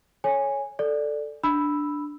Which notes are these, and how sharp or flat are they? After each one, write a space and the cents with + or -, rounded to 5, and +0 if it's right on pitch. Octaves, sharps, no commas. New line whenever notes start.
A4 -20 C#5 +0 G#5 -10
A4 +0 D5 +5
D4 +0 B5 +0 E6 +0